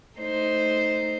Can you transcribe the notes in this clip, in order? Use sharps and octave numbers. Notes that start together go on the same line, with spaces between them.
A3 D#4 C5